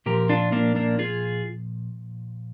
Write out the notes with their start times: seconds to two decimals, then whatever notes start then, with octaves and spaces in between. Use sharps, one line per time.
0.06 A#2 F3 G4 A#4
0.29 D4 F4
0.52 A#3 D4
0.76 A#3 D4
0.99 F4 G#4